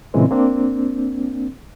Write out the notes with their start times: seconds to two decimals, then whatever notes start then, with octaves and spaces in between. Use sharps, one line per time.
0.14 A#2 C#3 E3 G#3 C4
0.31 A#3 C4 D4